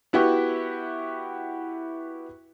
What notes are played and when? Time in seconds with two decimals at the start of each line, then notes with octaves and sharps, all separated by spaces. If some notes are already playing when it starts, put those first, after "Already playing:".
0.13 B3 E4 F#4 G4